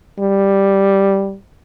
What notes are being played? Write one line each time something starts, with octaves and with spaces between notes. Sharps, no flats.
G3